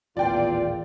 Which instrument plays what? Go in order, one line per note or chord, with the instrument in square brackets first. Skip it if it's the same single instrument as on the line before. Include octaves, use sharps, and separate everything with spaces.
[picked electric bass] D#1 A1 [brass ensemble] E2 A#2 F4 [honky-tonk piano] D5 G5